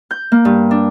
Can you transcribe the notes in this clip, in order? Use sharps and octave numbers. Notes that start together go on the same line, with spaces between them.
G6
A#3
G2
D4